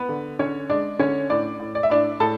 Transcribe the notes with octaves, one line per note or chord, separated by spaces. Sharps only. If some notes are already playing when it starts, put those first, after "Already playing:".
Already playing: B3 B4
D3
D3 C#4 C#5
G#3 D4 D5
D3 C#4 C#5
A2 D4 D5
A2
D5
E5
A2 D4 D5
A2 A4 A5